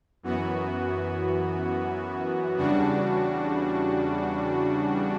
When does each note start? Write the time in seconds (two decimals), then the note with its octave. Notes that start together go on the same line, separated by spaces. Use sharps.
0.23 F#2 E3 B3 F#4
2.57 E2 C#3 G3 D4 F#4